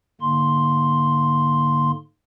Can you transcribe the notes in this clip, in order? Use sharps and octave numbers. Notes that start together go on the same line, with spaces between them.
G#2 D3 A#3 C6